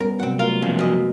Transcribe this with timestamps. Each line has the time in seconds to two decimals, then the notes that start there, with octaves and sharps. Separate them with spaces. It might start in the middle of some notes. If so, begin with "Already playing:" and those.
0.01 G3 B3 C#4 A#4
0.20 C3 F#3 A#3 C4 F#5
0.39 F#3 A3 F4 F#4 A#4 F5
0.62 F2 C#3 F3 A#3 B3
0.79 F#2 D#5